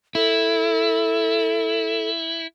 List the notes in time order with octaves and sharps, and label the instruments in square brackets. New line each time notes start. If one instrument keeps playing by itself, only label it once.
[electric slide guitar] E4 [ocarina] A4